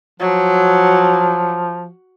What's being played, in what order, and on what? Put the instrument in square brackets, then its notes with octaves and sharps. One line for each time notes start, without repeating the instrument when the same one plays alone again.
[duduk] F3 [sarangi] F#3